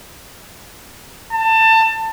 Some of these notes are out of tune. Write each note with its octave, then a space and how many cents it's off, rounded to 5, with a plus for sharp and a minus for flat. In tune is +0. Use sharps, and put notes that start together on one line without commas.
A5 +25